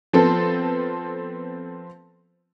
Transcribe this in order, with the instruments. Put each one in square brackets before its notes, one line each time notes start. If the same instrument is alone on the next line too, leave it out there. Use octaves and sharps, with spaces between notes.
[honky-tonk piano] F3 B3 C4 A4